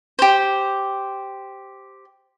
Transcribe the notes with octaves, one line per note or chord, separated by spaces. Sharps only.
G4 C5